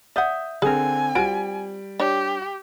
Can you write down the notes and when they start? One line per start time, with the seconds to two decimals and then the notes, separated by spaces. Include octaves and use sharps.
0.16 D5 E5 F#5 D#6 G6
0.62 D3 C4 G#4 A#4 G#5
1.15 G3 C4 F4 F#4 D7
2.00 D4 G4 C#5